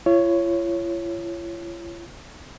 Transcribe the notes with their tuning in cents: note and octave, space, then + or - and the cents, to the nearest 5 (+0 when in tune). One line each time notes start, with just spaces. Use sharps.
F4 -45 C#5 +0